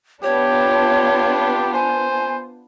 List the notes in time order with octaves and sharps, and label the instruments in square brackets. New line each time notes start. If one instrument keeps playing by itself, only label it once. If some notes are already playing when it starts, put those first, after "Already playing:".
[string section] B3 D4 F4 [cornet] G4 [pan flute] C#5
[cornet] C5 [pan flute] G#5